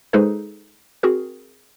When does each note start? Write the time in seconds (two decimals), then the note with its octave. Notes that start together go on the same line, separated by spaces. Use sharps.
0.13 G#3 D#4 G#4 A4 B4 C5
1.03 C4 F#4 G#4 A#4